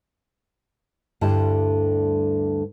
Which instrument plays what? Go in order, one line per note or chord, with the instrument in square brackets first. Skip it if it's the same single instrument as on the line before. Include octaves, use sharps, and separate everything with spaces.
[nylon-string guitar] D2 G2 D3 G3 E4 A5